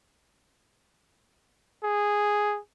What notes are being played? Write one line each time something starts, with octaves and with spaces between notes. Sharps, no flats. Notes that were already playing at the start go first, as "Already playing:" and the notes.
G#4